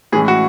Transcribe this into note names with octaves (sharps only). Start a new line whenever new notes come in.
A2 E3 G#3 C#4 G#4
F#4